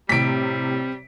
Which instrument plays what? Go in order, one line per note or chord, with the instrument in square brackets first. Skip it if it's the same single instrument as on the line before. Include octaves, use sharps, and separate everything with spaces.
[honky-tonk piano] A2 C3 [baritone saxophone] G3 [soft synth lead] C4 [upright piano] B6 D7